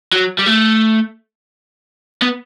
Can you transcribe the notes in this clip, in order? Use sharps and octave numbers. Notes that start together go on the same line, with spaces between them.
F#3
G3
A3
B3